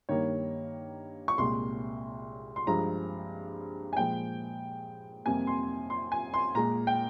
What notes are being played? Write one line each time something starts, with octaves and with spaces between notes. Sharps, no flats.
G2 D#3 G3 A#3 C#5
C#6
C2 A#2 G#3 C6
C6
G2 F3 G#3 A#5
G#5
A#2 F3 G#3 G5
F2 C3 G3 A#3 G#5
C6
C6
G#5
C6
A#2 G#3 A#5
G5